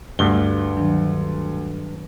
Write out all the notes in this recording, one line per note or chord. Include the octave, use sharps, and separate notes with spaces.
D2 G2 G7
D#3 F#3 D4